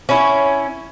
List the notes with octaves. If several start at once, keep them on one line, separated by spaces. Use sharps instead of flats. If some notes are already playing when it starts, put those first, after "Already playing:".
C#4 E4